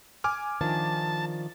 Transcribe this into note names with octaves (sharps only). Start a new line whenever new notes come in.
G#5 D6 F6
D#3 F3 D4 A5